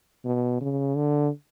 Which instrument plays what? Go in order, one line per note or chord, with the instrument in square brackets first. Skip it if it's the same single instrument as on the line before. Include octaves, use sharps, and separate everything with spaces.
[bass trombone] B2
C#3
D3